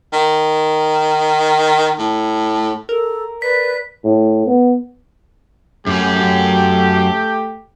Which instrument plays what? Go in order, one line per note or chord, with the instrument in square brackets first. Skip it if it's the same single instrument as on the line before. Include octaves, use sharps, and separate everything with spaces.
[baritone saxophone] D#3
A2
[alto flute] A4 [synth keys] A#4
[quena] B4 [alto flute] D5 [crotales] B6
[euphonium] A2
B3
[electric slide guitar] F#2 C#4 [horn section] A3 G4